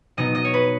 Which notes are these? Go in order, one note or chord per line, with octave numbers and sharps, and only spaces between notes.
B2 F#3 B3 D#4 D#5
D#5
C#5
B4